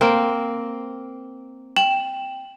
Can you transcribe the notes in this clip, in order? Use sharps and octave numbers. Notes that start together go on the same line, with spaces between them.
A#3 C4
G5 E7 F#7